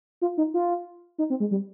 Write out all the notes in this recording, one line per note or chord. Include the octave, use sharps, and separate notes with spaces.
F4
D#4
F4
D#4
C4
G#3
G3